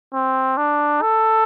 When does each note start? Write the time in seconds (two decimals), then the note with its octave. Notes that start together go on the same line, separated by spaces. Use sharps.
0.14 C4
0.57 D4
1.02 A4